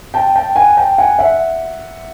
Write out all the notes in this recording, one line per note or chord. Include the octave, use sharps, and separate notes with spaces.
G5 A5
G5 A5
F#5 G#5
G5 A5
F#5 G#5
E5 F#5